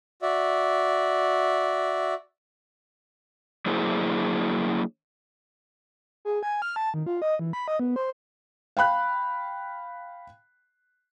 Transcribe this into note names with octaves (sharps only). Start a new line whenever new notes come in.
F#4 D5 E5
F#3 A#3 D4 E4 G#4 C5
G#4
G#5
F6
A5
D#3
F4
D#5
E3
B5
D#5
B3
C5
F5 G5 B5 F#6